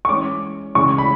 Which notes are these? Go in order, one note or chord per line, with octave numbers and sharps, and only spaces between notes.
C#6
E3 G#3 C#4 D6
C#3 E3 G#3 C#6
B5